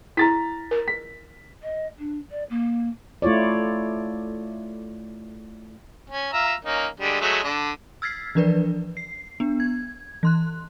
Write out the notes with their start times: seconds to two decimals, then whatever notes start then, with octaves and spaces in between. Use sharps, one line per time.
0.17 E4 A#5 A6 B6
0.71 A#4
0.88 B6
1.62 D#5
1.98 D4
2.30 D5
2.49 A#3
3.22 A3 E4 F4 C#5 D5
6.10 C#4
6.33 F4 E5 A#5
6.65 A#3 C#4 D#4
7.00 D3 G3 G#3
7.21 F#3 G#3 A3
7.43 D3 D4
8.02 E6 F6 G#6 A6 B6 C7
8.35 E3 F3 D4 A#4 B4 D5
8.97 C7
9.40 B3 D4
9.60 G#6
10.23 E3 C6 F#6